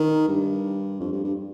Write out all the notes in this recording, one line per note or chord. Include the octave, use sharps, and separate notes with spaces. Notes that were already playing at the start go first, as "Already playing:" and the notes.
Already playing: D#3
G2
F2
G2
G2